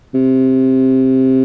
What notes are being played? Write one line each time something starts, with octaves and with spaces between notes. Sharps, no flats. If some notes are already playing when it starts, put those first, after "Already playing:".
C3